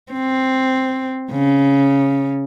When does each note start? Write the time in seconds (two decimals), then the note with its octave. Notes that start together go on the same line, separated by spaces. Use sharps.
0.12 C4
1.32 C#3